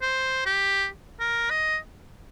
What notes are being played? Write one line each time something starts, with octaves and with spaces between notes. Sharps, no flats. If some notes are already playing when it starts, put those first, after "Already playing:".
C5
G4
A#4
D#5